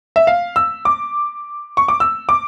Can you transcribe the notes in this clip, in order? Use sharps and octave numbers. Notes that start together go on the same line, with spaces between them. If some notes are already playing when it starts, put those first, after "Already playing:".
E5
F5
E6
D6
C#6
D6
E6
D6